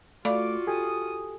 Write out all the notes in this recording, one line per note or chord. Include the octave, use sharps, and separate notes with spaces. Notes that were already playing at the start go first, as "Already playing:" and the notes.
A3 F4 F#4 D5 F5 B5 D6
G4 A4 G#5 D#6